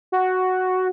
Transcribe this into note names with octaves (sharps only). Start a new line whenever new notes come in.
F#4